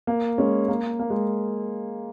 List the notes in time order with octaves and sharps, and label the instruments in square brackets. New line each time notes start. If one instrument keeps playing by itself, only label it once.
[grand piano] A#3
G#3 C#4
A#3
A#3
G#3